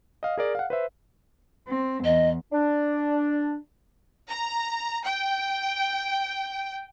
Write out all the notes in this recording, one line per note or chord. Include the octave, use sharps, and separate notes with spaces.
D#5 F5
G#4 A#4 D5
F5 F#5
B4 C5 E5
C4
E2 D#5
D4
A#5
G5